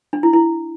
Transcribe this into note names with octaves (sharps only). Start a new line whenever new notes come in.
D4
E4
E4